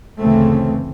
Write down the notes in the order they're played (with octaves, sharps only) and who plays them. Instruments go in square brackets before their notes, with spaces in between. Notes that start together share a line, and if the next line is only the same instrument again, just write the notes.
[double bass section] F#1 D2 C#3 E3 A3 C4